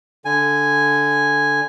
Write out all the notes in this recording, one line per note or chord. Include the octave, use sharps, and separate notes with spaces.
D3 G#5